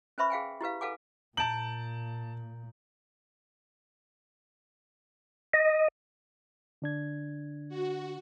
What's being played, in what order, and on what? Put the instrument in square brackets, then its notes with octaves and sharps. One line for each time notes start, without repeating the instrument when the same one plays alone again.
[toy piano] C#4 B4 C5 E5 B5 C#6
G#4 F5 G5 G#5
E4 G4 B4 F5
A4 B4 F5 F#5 G#5 D6
[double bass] A#2 [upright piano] A5 F#7 [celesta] A#5 G6 D7
[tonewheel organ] D#5
[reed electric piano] D3 D4 G#6
[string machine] F#4